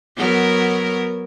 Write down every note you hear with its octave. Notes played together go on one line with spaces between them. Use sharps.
F#3 B3 A#4